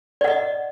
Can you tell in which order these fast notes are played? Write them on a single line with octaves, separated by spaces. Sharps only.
D5 F#5 D#5